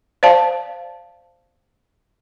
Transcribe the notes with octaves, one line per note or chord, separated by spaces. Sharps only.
C5 D5 F5 A5